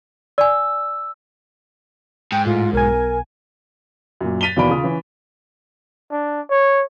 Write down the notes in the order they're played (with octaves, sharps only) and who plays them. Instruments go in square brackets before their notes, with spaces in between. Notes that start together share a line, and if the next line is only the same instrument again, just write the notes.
[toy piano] D5 G#5 [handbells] E6
[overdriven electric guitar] G#2 [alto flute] G5
[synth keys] A2 [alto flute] F4
[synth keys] B1 G#5 [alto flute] A#4
[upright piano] F#2 A#2
A6 B6 D#7 F7 G7
D#2 B2 E3 D5 B5 D7
C#3 F4 D#6
E3 C#4
[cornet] D4
C#5